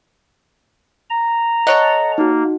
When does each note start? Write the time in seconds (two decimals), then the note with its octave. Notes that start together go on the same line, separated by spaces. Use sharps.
1.10 A#5
1.67 A4 C#5 D#5 F#5
2.18 A#3 D#4 F#4